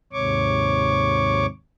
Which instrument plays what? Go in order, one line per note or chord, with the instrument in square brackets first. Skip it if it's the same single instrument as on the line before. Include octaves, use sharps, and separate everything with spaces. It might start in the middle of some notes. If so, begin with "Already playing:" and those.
[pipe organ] D#2 G#2 C3 C#5 C#6 D6